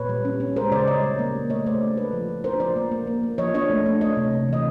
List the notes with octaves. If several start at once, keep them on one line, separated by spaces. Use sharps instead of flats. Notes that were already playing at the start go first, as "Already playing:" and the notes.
Already playing: A#2 B4 C#5
G3
C#4
C#4
G#3 A#4 C5
C#3 C5 D5
G3 C#5 D#5
G3
A#3
G3
A3 C#5 D#5
A3 C5 D5
D4
A3 A4 B4
F3
F3
D4 A#4 C5
F3 C5 D5
A#3
A#3
A#3
A#3
F3 C#5 D#5
D4 C#5 D#5
A3
D4
A3 C#5 D#5
C3
C3
E3 D#5